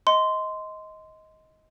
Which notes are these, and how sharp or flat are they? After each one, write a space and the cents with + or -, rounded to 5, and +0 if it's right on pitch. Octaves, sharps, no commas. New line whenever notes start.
D#5 +15 C6 -15